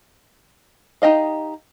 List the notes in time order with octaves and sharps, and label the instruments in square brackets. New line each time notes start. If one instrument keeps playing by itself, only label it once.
[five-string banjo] D#4 G4 D#5 F5